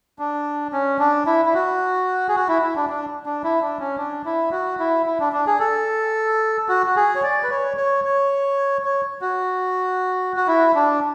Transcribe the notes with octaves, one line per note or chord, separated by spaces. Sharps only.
D4
C#4
D4
E4
E4
F#4
G#4
F#4
E4
E4
D4
D4
D4
E4
D4
C#4
D4
E4
F#4
E4
E4
D4
D4
G#4
A4
F#4
F#4
G#4
C#5
D5
B4
C#5
C#5
C#5
C#5
F#4
F#4
E4
D4